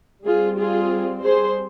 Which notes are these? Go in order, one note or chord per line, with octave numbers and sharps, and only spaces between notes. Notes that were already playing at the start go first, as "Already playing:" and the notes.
G3 C4 F4 G#4
F4 G#4
G#4 C5